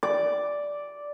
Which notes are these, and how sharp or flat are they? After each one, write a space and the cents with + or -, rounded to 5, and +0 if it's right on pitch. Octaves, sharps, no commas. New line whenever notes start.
D5 -5 D6 +0